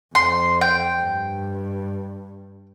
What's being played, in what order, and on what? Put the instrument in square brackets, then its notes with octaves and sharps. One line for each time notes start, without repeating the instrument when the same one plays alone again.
[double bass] F2 [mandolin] C6
[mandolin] G5
[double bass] G2